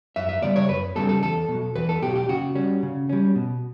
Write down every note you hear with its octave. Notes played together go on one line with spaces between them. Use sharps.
F#2 E5
E5
C#3 G3 B3 D5
C#5
F#2 B4
C#3 G3 B3 A4
A4
E2 A4
B2 F#3
E2 B4
A4
B2 F#3 G4
G4
C#3 F#4
G3 C#4
C#3
G3 C#4
B2